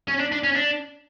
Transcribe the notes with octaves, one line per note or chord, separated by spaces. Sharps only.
C#4
D4
D4
C#4
D4